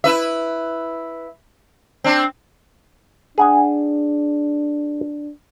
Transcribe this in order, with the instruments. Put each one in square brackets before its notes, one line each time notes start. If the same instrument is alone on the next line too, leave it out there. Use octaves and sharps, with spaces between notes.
[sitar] E4 B4 E5
C4 D4
[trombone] D4 [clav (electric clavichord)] G#4 F#5 G#5